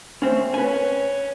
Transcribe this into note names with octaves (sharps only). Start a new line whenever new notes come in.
A3 C4 C#4
C#4 B4 G#5